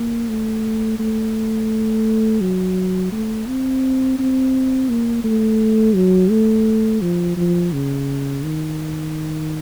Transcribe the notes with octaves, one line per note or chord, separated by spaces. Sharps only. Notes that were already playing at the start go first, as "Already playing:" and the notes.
Already playing: A#3
A3
A3
F#3
A3
C4
C4
A#3
A3
F#3
A3
F3
F3
C#3
D#3